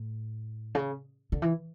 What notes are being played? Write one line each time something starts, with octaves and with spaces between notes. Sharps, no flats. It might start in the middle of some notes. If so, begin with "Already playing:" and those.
Already playing: A2
C#3
D3
E3